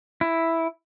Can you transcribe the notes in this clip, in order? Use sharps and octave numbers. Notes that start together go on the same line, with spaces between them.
E4